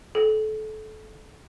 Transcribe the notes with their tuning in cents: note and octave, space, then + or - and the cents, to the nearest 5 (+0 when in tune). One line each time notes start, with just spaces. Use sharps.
A4 -25